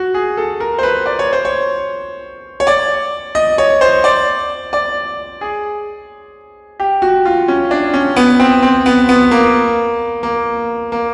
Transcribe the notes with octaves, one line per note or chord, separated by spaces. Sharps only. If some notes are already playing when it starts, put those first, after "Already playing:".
Already playing: F#4
G#4
A4
A#4
C5
B4
D5
C#5
C5
C#5
C#5
D5
D#5
C#5
C5
D5
D5
G#4
G4
F#4
F4
C#4
D4
C#4
B3
C4
C4
B3
B3
A#3
A#3
A#3